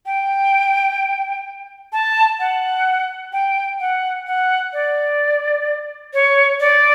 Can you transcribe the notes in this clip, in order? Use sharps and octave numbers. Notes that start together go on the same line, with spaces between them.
G5
A5
F#5
G5
F#5
F#5
D5
C#5
D5